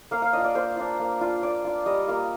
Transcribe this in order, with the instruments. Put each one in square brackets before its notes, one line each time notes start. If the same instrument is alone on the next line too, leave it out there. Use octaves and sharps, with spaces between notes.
[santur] A#3 F5
F5
D4 F4 D#5
D5
A#3 C5
D4 F4
A#3
D4 F4
A#3 D5
D4 F4
G3 D#5
A#3 F4